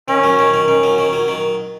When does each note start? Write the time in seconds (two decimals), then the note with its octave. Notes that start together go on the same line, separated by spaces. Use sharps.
0.08 D#3 C#4
0.24 F#3
0.39 D#3
0.54 D#3
0.68 D#3 C#4
0.83 F#3
0.98 D#3
1.13 F#3
1.28 D#3